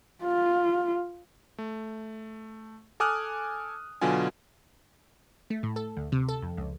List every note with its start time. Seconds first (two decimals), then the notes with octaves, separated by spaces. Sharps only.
0.24 F4
1.58 A3
3.00 A4 G#5 D6 D#6 F6 F#6
4.01 B2 D3 F#3 F4 G#5
5.50 A3
5.63 A2
5.76 A4
5.97 D2
6.12 C3
6.29 A4
6.42 F2
6.57 C#2